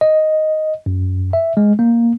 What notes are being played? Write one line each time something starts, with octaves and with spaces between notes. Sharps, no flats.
D#5
F#2
E5
G#3
A#3